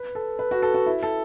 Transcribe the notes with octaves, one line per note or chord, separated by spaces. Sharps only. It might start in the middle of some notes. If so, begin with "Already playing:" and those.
Already playing: B4
A4
B4
F#4
A4
F#4
E4
A4